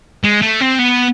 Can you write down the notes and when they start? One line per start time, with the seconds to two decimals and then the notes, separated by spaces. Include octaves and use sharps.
0.24 G#3
0.42 A3
0.60 C4
0.79 B3